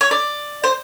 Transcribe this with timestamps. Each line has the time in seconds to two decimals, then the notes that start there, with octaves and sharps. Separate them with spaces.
0.01 C#5
0.11 D5
0.64 C5